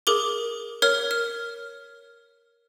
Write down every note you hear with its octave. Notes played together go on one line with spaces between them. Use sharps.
G#4 A#4 D6 G7
A#4 C#5 F6
F6